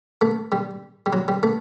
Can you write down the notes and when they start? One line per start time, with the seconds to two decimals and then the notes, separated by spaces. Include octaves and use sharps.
0.21 A3
0.52 G3
1.06 G3
1.13 F#3
1.28 G3
1.43 A3